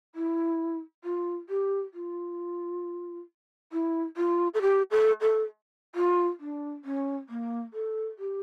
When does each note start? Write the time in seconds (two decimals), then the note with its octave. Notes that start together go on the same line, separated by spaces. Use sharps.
0.15 E4
1.04 F4
1.49 G4
1.94 F4
3.73 E4
4.17 F4
4.54 A4
4.62 G4
4.91 A4
5.21 A4
5.95 F4
6.40 D4
6.85 C#4
7.29 A#3
7.74 A4
8.19 G4